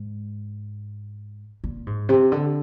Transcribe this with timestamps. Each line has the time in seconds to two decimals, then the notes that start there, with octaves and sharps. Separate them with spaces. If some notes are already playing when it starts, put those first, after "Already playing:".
Already playing: G#2
1.64 A#2
1.87 G#2
2.09 C3
2.32 D3